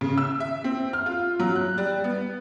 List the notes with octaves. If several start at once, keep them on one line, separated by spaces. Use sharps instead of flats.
C#3
E6
E5
C4
F6
F4
F#3
F#6
G3
B3